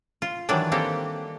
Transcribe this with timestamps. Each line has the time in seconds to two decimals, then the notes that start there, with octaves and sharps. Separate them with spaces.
0.22 F4
0.49 D#3 E3 F#3 G3 D4
0.72 G3 A#3 C4 G4 A4